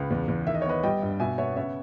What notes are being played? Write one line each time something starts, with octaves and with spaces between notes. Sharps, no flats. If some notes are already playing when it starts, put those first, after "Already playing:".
Already playing: C#2 B4
E2
E2
D#3 E5
D#5
C#5
B3 B4 D#5
G3 D#5 G5
G2
B2 E5 G#5
B3 C#5 E5
C#3 C#5 E5